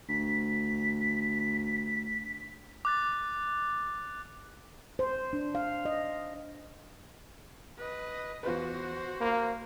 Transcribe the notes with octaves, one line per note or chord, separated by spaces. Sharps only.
D2 B6
D6 F#6 A6
C5
D4
F5
D#5
B4 D#5
E2 F4 F#4 B4 C5
A#3 F5 B5